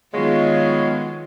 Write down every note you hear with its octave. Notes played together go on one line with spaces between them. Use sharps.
D#3 F#3 G#3 B3 F4 C#5 F5